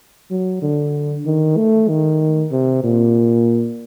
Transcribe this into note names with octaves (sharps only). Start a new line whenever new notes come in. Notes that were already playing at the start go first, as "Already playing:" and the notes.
F#3
D3
D#3
A3
D#3
C3
A#2